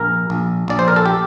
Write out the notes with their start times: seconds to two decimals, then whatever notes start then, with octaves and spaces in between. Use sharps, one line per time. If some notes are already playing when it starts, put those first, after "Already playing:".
Already playing: A#1 A#4
0.30 A#1
0.68 A#1 D5
0.79 C5
0.88 A#4
0.96 A4
1.06 G4